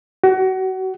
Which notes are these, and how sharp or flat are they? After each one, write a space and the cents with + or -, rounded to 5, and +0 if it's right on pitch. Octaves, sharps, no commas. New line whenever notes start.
F#4 +30